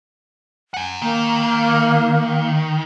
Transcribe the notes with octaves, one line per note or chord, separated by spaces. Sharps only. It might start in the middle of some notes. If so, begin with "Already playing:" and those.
F#5 G#5
D#3 A#3